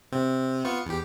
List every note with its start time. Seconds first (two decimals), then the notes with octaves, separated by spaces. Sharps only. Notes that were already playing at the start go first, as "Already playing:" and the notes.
0.12 C3 C4
0.65 B3 F4 C#6
0.86 E2 G4